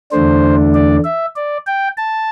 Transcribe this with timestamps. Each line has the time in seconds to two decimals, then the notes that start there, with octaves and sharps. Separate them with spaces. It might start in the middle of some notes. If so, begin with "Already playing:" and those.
0.12 E2 D3 A3 D4 C5
0.74 D5
1.04 E5
1.36 D5
1.67 G5
1.97 A5